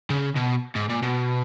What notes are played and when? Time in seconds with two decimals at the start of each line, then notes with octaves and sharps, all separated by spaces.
0.10 C#3
0.36 B2
0.76 G#2
0.90 A#2
1.02 B2